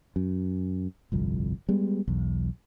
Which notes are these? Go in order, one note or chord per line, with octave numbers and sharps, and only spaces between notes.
F#2
G1 C2 F2
G3 G#3 B3
B1 E2